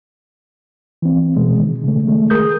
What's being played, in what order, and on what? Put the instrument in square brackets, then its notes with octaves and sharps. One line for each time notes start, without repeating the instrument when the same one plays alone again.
[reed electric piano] E3 C4
B2 G#3
D#3
C#3 A3
D#3 G#3 A3
G#4 A#4 D#6 G6